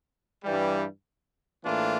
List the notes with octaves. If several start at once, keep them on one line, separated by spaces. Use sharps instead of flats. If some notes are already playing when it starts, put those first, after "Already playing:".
G2 E3 G3
A2 E3 A#3 D4 F4